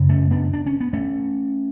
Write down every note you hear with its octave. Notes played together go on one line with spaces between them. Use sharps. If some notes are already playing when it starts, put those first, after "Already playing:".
Already playing: F#2 C#3
A3 C#4
B3 D4
D4
C#4
B3
A3 C#4